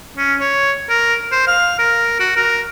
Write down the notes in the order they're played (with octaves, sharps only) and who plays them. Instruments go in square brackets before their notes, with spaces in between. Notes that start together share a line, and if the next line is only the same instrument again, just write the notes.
[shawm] C#4
C#5
A#4
C5
F5
A#4
F#4
A#4